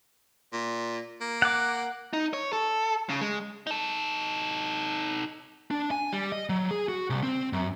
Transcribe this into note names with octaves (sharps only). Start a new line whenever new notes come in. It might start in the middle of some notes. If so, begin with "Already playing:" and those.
A#2
A#3
F#5 D6
D#4
C#5
A4
C#3
G#3
D#4 A4
D4
G#5
G3
D#5
F#3
G#4
F#4
C2
C4
F#2